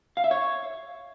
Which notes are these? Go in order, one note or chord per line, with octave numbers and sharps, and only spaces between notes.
F5
E5
C#5